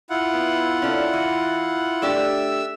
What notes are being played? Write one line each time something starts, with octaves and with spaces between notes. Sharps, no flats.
E4 F4 F#5
B3
C#4 D4 A4
E3
A3 D4 G4 E5 E6